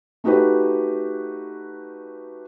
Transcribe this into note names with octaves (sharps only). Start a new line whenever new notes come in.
A3 D#4 F#4 G4 B4